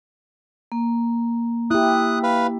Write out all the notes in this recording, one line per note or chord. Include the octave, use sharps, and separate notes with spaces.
A#3
E4 G4 D#6 F#6
B4 F5 B5